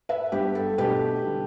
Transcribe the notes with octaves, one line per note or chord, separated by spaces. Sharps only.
B4 E5
G2 G3 B3 G4 B4
A4
B2 A3 D4 G4 B4
D3 G3 D4